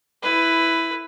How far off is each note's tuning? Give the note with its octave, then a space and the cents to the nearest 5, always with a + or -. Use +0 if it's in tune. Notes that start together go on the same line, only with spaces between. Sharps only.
E4 +0 B4 +10